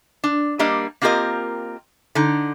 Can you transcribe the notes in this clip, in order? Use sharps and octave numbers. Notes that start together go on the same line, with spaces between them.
D4
G3 A#3 D4 D#5
A#3 C4 F4 G4 A#4 D#5
D3 D#4